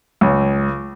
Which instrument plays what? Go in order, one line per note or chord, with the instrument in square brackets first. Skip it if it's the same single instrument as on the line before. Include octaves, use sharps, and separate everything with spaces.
[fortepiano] C#2